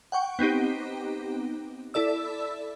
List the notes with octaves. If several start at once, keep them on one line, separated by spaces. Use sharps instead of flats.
F#5 G5 C#6
B3 C4 D#4 G4
E4 A4 D5 E6